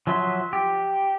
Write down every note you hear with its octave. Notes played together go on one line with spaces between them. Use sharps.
F3 F#3 E5 C6
G4